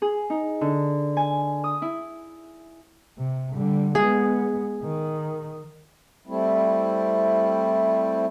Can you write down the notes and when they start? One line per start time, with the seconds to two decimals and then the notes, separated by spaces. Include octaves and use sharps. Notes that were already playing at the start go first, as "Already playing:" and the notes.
0.02 G#4
0.30 D#4
0.61 D3
1.17 G#5
1.64 D#6
1.82 E4
3.18 C3
3.55 D3 G3
3.95 G#3 B3 G#4
4.83 D#3
6.27 G3 A3 C4 E4